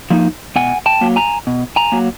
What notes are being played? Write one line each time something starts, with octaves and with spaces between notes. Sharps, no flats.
F3 A#3 D#4
B2 F#5 G#5
G5 A5
F#3 A#3
G#5 A#5
B2
G#5 A#5
F#3 A#3